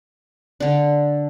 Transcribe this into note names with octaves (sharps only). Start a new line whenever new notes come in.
D3 D4